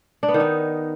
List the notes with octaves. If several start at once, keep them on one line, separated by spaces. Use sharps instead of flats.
D4
B3
D#3
D#4